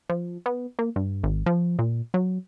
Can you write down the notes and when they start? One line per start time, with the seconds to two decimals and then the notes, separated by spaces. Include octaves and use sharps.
0.09 F3
0.46 B3
0.79 A#3
0.96 G2
1.24 G#1
1.46 F3
1.79 A#2
2.14 F#3